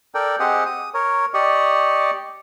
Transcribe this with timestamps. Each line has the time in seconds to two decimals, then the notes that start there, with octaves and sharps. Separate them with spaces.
0.15 A4 A#4 D5 G5
0.40 C4 G4 G#4 D#5 F#5
0.66 D#6
0.94 A#4 C#5
1.34 G4 D5 D#5 C#6